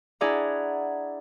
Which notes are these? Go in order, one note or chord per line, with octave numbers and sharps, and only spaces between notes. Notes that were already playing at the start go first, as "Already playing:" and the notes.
D4 E4 G#4 D5 F#5 A#5